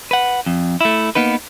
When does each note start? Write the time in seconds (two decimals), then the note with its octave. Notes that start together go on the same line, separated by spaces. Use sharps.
0.11 B4 F#5
0.46 F2
0.81 A3 E4
1.15 A#3 B3 D#4 B4